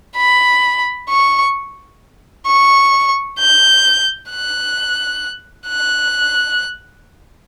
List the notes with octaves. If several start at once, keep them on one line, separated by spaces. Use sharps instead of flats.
B5
C#6
C#6
G6
F#6
F#6